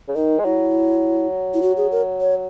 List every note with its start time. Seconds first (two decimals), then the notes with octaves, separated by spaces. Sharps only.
0.08 C#3
0.16 D#3 D#4
0.39 G#3
0.45 F#3 E4
1.54 E4
1.62 F#4
1.77 G#4
1.92 A#4
2.21 C#5